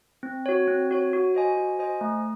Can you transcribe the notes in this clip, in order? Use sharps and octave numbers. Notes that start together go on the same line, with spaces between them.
C4
F#4 C#5
C4
F#4 C#5
F#4
C5 D#5 G#5
F#4
C5 D#5 G#5
A3